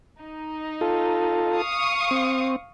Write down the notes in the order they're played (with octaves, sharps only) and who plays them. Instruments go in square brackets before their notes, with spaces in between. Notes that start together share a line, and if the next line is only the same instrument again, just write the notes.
[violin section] D#4
[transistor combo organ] F4 A4
[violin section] F5 C#6 D#6
[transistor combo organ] C4